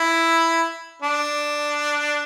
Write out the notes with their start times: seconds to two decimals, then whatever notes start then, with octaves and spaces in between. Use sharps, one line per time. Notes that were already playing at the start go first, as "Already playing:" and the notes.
Already playing: E4
1.02 D4